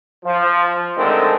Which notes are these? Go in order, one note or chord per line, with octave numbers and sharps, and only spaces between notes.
F3
D3 D#3 G#3 A3 C4